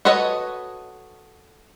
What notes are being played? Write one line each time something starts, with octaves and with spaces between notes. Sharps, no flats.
F#4 A4 B4 C#5 D#5